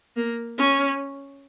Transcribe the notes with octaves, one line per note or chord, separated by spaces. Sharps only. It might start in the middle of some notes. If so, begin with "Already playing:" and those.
A#3
C#4